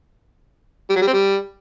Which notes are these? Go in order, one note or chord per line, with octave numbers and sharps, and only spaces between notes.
G3
F#3
G3
C4
G3